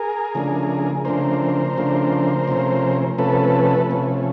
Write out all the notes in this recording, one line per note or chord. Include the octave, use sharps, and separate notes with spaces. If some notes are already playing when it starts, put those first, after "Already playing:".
Already playing: G#4 A#4
C#3 F3 A3 D4
C#3 F3 A3 D4 A#4 C5
C#3 F3 A3 D4
C3 F3 A3 C#4
C3 F3 A3 C#4 A4 B4
C3 F3 A3 C#4